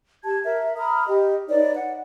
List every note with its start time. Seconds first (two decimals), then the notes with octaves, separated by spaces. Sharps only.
0.24 G4 A5 G#6
0.44 A#4 E5
0.77 A#5 B5 D#6 F6
1.08 G4 D#5
1.48 D#4 B4 C#5 D5
1.75 F#5